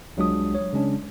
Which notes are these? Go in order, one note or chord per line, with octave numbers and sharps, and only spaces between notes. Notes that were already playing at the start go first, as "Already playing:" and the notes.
C2 F#3 G#3 D4 F4 D#6
C#5
C#3 G#3 C#4 D4